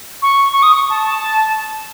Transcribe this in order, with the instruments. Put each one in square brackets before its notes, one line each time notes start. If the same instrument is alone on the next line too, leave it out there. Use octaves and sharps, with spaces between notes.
[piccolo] C#6
C#6
D#6
C#6
A5
A5